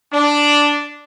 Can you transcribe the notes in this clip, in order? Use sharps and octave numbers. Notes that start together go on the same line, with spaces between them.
D4